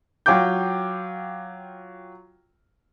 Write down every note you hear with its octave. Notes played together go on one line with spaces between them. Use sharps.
F#3 F4 G5 D6 G6